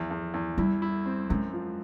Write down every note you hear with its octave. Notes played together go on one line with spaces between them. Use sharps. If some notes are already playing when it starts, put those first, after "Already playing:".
Already playing: E2 F3
E2
E2
G3 E4
E4
C4
F#2 G#3
F3